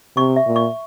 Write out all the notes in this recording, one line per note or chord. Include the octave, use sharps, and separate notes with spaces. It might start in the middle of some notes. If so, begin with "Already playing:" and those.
C3 C#6
E5
A#2
C#6